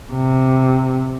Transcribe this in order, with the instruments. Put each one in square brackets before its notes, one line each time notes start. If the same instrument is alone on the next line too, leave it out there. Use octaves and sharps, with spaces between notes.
[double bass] C3